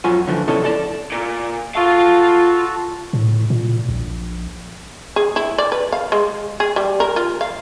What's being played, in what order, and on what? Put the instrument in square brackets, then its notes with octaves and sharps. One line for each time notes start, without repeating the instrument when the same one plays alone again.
[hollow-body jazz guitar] F2 F#3 F4 C#5 G#5
D3 E3 F3 A3
D2 C3 C#4 E4 A4 D#5
A4 D5 A5
[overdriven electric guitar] A#2
[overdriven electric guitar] F4 F5 [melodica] F#4 A4
[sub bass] A2
A#2
A#1
[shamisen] G#4
E4
D5
B4
F5
G#3
G#4
G3
A#4
F4
F5